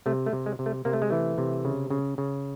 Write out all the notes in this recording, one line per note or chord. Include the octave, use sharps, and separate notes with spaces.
C3 A3
A3
C3
G#3
C3
A3
C3 A#3
A3
G#3
E3 A3
C3
C#3
C#3
C#3